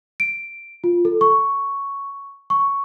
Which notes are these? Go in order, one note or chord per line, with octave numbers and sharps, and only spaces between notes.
D7
F4
A4
C#6
C#6